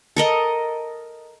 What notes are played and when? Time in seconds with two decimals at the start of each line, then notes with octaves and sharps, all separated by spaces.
0.16 A4 A#4 D#5